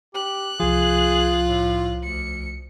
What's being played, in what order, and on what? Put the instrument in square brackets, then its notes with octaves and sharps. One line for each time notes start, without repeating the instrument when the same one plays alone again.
[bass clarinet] G4 [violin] F#6
[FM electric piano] C2 F3 [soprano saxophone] F4 [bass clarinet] G#4
[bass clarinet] A2
[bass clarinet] D2 [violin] C#7